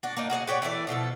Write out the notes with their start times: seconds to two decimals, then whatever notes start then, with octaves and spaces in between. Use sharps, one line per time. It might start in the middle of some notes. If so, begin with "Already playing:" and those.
0.03 D4 F#4
0.17 A#3 D4 D#4
0.30 F#4 G#4 D5 F#5
0.47 F#4 G4 C#5 D5
0.62 E3 A3 E4 D5
0.87 B2 D3 F3 A4